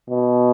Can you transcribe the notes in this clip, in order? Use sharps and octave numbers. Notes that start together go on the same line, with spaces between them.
B2